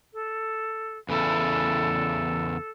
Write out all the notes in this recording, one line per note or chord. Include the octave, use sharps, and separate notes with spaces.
A4
E2 C#3 E4 A4